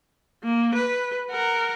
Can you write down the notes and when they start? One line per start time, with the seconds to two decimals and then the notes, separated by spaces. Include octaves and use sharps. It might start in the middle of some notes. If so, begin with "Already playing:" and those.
0.43 A#3
0.74 B4
1.31 A#4 F#5